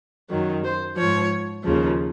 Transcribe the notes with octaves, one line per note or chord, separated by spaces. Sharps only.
F#2 D#3 F#3
C5
G#2 F3 C#5
D#2 C#3 F3